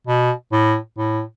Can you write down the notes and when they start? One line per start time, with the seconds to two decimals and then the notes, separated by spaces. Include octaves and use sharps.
0.07 B2
0.52 A2
0.98 A2